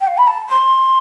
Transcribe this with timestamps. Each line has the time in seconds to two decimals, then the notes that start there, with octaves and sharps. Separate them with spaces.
0.01 G5
0.07 F5
0.17 B5
0.27 A5
0.49 C6